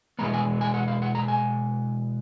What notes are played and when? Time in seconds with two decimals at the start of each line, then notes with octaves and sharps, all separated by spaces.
0.19 B2 G#3 B3 A#5
0.34 G#5
0.61 G#5
0.74 F#5
0.88 F5
1.02 F#5
1.15 A#5
1.28 G#5